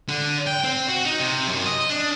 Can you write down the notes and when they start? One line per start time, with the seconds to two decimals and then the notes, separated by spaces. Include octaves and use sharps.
0.08 D3
0.47 G5
0.64 C4
0.88 F#4
1.06 D#4
1.20 C3
1.47 F#2
1.66 D#5
1.90 D4